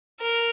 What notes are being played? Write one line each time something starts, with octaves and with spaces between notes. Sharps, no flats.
A#4